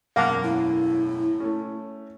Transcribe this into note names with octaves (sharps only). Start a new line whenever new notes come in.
E1 F#2 A#3 F5 F#5 A5
A2 E4
A3 C#4